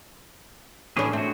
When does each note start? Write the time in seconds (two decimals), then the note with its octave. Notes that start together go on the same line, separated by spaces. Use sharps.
0.97 A2 E3 C#4 D4 G#4
1.13 A3 C4 F#4